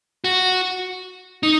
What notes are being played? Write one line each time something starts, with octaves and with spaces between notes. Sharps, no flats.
F#4
D#4